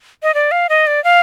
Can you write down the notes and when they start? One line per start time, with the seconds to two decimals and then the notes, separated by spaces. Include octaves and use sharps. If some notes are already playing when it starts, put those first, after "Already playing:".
0.23 D#5
0.34 D5
0.51 F5
0.69 D#5
0.87 D5
1.04 F5